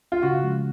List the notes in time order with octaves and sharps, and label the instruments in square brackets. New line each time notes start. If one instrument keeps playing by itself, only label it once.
[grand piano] F4
[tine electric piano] C#3 [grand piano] F#4
[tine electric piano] F3 G#3 C#4